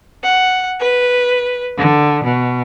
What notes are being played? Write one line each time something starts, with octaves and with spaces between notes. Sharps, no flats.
F#5
B4
D3
B2